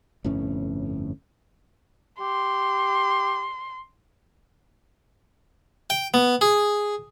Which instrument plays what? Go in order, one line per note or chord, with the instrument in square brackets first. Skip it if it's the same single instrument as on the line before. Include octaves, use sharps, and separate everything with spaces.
[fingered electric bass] G1 F2 A2 C#4
[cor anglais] G4 [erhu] C6
[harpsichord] G5
B3
G#4